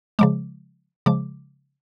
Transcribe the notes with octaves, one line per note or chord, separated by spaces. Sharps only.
C#3 F3 G#3 D6
C#3 F3 G#3 D6